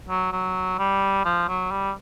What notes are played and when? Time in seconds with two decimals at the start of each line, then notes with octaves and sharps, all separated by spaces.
0.09 F#3
0.32 F#3
0.78 G3
1.25 F3
1.48 F#3
1.71 G3